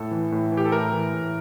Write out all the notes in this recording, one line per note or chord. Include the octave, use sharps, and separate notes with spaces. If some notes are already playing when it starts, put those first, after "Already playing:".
Already playing: A2 A4
E3
A2
E3
G4
A4
A2 A#4
E3
A2